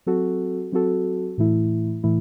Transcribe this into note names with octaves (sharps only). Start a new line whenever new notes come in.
F#3 C4 F#4 A4
F#3 C4 F#4 A4
A2 E3 A3 E4
A2 E3 A3 E4